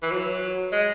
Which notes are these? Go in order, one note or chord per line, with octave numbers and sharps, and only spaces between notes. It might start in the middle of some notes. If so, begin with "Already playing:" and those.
E3
F#3
G#3